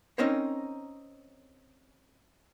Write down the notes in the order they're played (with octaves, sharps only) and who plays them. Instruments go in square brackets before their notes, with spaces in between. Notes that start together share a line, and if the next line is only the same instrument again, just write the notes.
[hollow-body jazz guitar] C4 C#4 D#4 A#4 C5 C#5